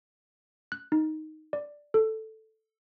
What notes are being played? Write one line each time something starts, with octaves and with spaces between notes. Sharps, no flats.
F#6
D#4
D5
A4